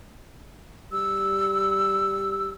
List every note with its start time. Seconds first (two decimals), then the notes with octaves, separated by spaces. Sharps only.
0.92 G3 E6